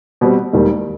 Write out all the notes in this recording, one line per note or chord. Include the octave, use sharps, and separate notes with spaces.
B2 G3 C4
E1 D#2 D#3 G3